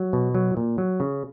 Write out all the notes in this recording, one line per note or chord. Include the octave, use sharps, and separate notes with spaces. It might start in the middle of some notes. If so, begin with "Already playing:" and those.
Already playing: F#3
B2
F#3
A#2
F#3
C#3